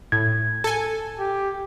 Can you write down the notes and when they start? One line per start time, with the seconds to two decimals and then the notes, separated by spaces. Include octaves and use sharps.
0.12 A2 G#6
0.64 A4 G#5
1.19 G4